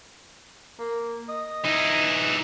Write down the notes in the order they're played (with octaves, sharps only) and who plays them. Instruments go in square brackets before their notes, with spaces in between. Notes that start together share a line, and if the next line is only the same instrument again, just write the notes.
[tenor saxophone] A#3
D#5
[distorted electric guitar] E3 D#4